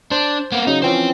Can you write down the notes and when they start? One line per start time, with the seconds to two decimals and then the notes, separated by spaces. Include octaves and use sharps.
0.11 D4 C5
0.52 A#3 B3
0.67 C#3 F#3 D#4
0.82 E3 F3 C#4 C5 G5